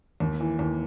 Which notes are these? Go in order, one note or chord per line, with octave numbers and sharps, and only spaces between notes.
D#2
E3
D#2